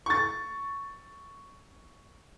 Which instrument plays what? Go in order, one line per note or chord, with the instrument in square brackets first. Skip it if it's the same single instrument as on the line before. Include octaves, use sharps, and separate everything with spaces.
[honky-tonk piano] C#6 A6